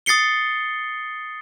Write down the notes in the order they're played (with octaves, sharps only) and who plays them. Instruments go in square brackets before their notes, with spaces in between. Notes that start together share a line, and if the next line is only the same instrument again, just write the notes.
[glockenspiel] D#6 A6 C7 C#7 G7